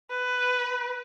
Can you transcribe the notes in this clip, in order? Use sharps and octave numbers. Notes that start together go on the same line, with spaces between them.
B4